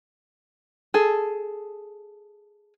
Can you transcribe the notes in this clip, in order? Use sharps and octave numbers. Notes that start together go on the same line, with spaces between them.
G#4 A4